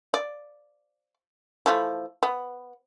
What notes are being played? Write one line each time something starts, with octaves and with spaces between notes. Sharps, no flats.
D5
E3 F3 A3
B3